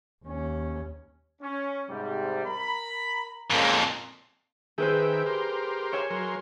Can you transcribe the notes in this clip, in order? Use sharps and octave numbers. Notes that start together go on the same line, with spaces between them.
D#2 C#4
C#4
G#2 C3 G3
A#4 A#5 B5
F2 A#2 G#3 C#4 A#4
D#3 G#4 B4 C5 E5 G5
G4 A#4 C6
C#5 E5 G#5
F#3 A#4 C6